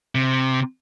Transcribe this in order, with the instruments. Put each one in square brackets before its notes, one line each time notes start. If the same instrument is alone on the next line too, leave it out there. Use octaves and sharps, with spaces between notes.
[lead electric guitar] C3